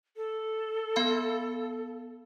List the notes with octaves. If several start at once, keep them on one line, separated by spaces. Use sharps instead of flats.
A4
B3 F5 B5